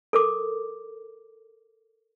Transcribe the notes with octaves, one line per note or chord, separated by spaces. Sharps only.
A4 A#4 D6